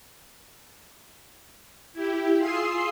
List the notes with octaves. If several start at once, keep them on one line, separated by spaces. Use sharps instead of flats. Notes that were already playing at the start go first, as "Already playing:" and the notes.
E4 G4
F4 G#4 C6 D#6 E6 C7